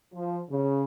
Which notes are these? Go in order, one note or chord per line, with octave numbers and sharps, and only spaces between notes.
F3
C#3